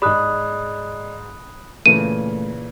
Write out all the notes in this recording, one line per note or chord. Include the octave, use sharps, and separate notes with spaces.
G#2 G#4 D5 D#5 B5 D#6 F#6
A#2 C#3 E3 A3 D#7